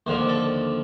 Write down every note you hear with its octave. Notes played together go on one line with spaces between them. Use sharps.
D#2 D3 F3 C5
A4